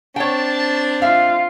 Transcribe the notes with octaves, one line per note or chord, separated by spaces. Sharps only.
C4 D4 C#5 G5 A5
F4 E5 F5